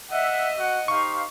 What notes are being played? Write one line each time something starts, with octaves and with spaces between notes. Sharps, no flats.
D#5 E5 F#5
F#4 F#5
D#4 G4 C5 F5 C#6